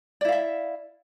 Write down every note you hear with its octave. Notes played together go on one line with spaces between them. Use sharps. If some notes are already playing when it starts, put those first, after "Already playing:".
E4 D5 E5 F5